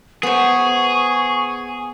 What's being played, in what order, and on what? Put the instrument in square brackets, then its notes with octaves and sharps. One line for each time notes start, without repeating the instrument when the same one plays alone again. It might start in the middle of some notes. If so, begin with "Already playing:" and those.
[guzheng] B3 C5 [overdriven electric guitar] G#4 [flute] C#6